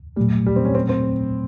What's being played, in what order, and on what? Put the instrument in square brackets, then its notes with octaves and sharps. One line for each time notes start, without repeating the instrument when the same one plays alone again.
[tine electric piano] A#2 F#3 A3 [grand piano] G3
[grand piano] G3
C4
C#4
C4
C4